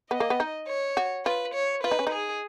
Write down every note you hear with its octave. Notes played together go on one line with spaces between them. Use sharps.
B3 D#5
A#3
B3
D#4
C#5
F#4
F4 B4
C#5
F4 B4
D#4
C#4
D#4
G#4